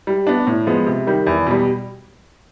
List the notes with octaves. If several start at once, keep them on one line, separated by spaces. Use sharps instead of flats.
G3
B3 D4
A2
F3 G#3 B3
C3
D#3 G3
E2
B2 G3